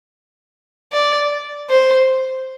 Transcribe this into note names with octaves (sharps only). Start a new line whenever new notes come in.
D5
C5